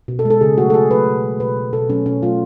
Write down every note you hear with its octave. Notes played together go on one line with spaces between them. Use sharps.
B2
A4
G#3
A4
C#3 G#4
F#3 A3 F#4
A4
C#3 G#4
F#3 A3 B4
B2
G#3
B2 B4
G#3
B2 A4
F#3 A3 C#4
B2 C#4
F#3 A3 F4